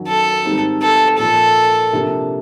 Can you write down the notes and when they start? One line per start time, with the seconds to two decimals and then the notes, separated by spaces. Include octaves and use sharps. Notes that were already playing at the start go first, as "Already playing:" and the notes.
Already playing: F#2 D#3 F#3
0.08 A4
0.45 G#2 D#3 G3 C4 D#4
0.82 A4
1.18 A#2 F3 A#3 A4
1.92 C3 F3 A#3 D4 G4